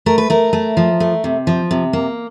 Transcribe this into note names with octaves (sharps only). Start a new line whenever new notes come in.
A3 A#4
B4
A3 A#4
A3
F3
A3
C3
F3
C3
A#3